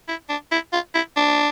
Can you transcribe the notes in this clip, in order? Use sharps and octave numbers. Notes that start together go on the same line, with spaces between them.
E4
D4
E4
F4
E4
D4